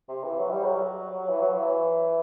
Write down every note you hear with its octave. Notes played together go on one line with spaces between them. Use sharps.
C3
E3
F#3
G3
F#3
E3
F#3
E3